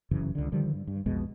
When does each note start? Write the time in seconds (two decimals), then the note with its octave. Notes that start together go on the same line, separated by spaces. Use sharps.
0.11 F1 F#2 C#3 E3
0.35 C#2 D3
0.52 D3 D#3 F3 G3
0.73 G2
0.87 G2
1.06 B1 F2 B2 G#3